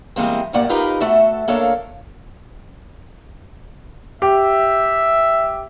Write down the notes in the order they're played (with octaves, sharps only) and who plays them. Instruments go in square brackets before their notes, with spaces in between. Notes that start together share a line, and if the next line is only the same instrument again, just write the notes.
[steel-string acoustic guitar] E3 G3 G#3 A#3 C4
F#2 A2 G3 A#3 D5 F#5
D#4 F4 G4 A#4 B4 D#5
A3 F#4 A4 E5
A#3 D4 A4 A#4 C#5 F5
[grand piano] G4 [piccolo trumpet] E5